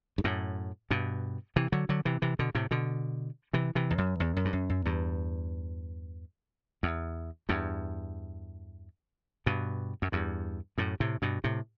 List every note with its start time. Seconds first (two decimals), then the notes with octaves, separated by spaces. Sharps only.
0.18 G2
0.24 F#2 A2
0.90 G2 B2
1.56 C3 E3
1.72 D3 F#3
1.89 D3 F#3
2.05 C3 E3
2.22 C3 E3
2.39 B2 D3
2.55 A2 C3
2.71 B2 D3
3.53 C3 E3
3.75 C3 E3
3.90 E2
3.98 F#2
4.20 E2
4.36 F#2
4.45 G2
4.53 F#2
4.70 F#2
4.85 E2 G2
6.83 E2
7.49 E2 G2
9.46 G2 B2
10.02 F#2
10.12 E2 G2
10.78 F#2 A2
11.00 A2 C3
11.22 G2 B2
11.44 A2 C3